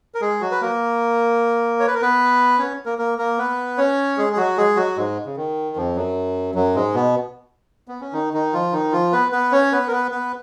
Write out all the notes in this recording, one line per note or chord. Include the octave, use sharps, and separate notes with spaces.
A#4
G#3 G#4
F#3 F#4
B4
A#3 A#4
C#5
B4
A#4
B3 B4
C#4 C#5
A#3 A#4
A#3 A#4
A#3 A#4
B3 B4
C#4 C#5
G#3 G#4
G#4
F#3 F#4
G#3 G#4
F#3 F#4
G#2 G#3
C#3
D#3
F2 F3
F#2 F#3
F#2 F#3
G#2 G#3
B2 B3
B3
C#4
D#3 D#4
D#3 D#4
F3 F4
D#3 D#4
F3 F4
B3 B4
B3 B4
C#4 C#5
B3 B4
A#4
B3 B4
B3 B4